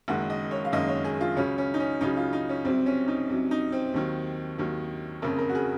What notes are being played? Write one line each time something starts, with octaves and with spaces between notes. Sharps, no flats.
F#1 F#2 D#3 G#3 F#5
D#5
C#5
F5
F#1 F#2 D#3 G#3 D#5
C#5
G#4
F4
C#2 C#3 F#3 C#4
C#4
D#4
C#4
C#2 C#3 F#3 D#4
F4
D#4
C#4
C2 C3 F#3 C4
C#4
D#4
C2 C3 F#3
D#4
C4
D#2 D#3 F#3
D#2 D#3 F#3
F#1 F2 C#3 A#4
A#4
F#4
G#4